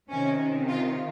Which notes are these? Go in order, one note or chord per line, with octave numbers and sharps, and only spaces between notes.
C3 D#3 C#4
F4